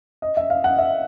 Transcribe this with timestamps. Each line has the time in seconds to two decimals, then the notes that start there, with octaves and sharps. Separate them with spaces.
0.22 D#5
0.37 E5
0.50 F5
0.64 F#5
0.79 E5